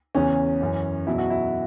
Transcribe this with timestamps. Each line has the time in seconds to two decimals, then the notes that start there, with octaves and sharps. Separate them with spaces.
0.15 E2 C#3 E3 C#4
0.61 F#2 E3
1.07 E2 B2 F#3 E4
1.18 F#4
1.30 E4